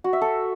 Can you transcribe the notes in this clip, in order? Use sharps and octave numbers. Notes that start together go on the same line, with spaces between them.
F#4
E5
A4